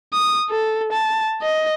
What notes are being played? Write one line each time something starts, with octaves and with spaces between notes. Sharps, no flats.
D#6
A4
A5
D#5